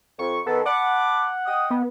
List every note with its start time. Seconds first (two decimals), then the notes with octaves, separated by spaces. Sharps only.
0.19 F2 C#6
0.47 D#3 B3 A4
0.66 F#5 A5 B5 D6
1.46 D#5 G5 D#6
1.70 B3